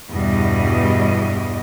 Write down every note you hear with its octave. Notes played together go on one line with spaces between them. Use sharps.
E2 G2 B2 G3 D#5